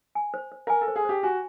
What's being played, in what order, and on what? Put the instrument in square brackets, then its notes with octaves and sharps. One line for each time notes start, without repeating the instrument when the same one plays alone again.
[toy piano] G#5
C5
C5
[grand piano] A#4 [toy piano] G#5
[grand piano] A4
[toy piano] C5
[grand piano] G#4
[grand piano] G4 [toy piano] C5
[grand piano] F#4 [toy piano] G#5